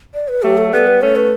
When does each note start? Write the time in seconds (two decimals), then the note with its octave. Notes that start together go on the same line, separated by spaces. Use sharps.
0.14 D5
0.28 B4
0.42 F#3 A3 G4
0.57 A4
0.72 G3 B3 A4
0.87 B4
1.01 A3 C#4 C#5
1.16 B4